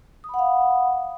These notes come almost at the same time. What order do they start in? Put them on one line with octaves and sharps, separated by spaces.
D#6 B5 F#5 F5